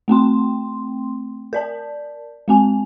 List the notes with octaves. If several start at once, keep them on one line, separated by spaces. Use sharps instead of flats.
A3 C4 G5 C6
A#4 D5 A5
G#3 C4 G#5